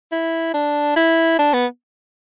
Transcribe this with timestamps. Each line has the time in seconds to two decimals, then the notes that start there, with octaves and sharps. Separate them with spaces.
0.12 E4
0.54 D4
0.96 E4
1.39 D4
1.53 B3